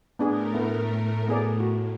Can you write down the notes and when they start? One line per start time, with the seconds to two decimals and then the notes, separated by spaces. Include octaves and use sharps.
0.19 A2 A3 B3 D4 G#4 A#4
0.53 B3 E4
1.28 A2 B3 G#4 D5
1.60 F#4